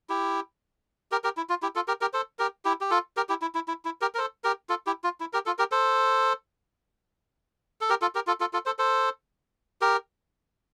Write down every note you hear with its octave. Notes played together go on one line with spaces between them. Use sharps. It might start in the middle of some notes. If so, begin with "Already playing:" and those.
E4 G4
G4 A#4
G4 A#4
E4
F4
E4 G4
F4 A4
G4 A#4
G4 A#4
A4 C5
G4 A#4
E4 G4
G4
F4 A4
G4 A#4
E4 G4
E4
E4
E4
E4
G4 A#4
A#4
A4 C5
G4 A#4
F4 A4
E4 G4
F4
E4
G4 A#4
F4 A4
G4 A#4
A4 C5
A4
G4 A#4
F4 A4
G4 A#4
F4 A4
F4 A4
F4 A4
A4 C5
A4 C5
G4 A#4